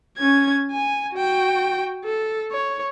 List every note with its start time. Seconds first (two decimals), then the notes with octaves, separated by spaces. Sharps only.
0.18 C#4 G#6
0.71 G#5
1.13 F#4 G5
2.04 A4
2.52 C#5